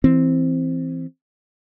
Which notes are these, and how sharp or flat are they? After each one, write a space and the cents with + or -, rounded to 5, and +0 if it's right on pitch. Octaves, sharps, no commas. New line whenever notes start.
E3 +0 C4 +0